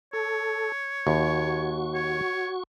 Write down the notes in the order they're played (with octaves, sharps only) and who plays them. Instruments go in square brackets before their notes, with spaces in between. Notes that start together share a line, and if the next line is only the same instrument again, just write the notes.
[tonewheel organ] A4 [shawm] C#5
[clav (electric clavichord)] D#2 [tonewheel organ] F#4 C#6
[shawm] C#5